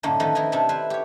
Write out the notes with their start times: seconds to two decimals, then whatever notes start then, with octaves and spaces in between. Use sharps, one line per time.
0.03 F#2 A2 D3 A3 A#3 D#4
0.20 D#3 F3 A3 D#4 A4 B4
0.35 D#3 D#4 E4 D#5
0.52 C3 D4 D#4 A4 E5 A5
0.69 E4 B4 C5 E5
0.90 G4 C#5